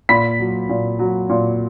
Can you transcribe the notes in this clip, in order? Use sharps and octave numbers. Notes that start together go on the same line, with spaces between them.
A#2 B5 B6
F#3
A#2
F#3
A#2